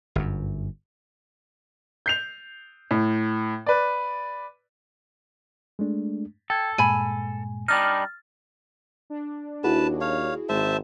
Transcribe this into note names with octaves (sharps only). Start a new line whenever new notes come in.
G1 F#2
G6 C7 F7
A2
B4 D5
G#3 A3 D4
A4 G5 G#6
G2 A#2 G#3 G#5 B5
G3 D4 D#4 F6 A6
D4
D#2 E4 F#4 G#4 B4 A5
C#5 F5
G#1 G#3 C5 E5 A5